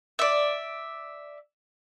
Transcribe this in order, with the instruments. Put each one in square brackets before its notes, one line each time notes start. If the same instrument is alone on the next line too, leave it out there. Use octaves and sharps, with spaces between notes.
[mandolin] D5 E5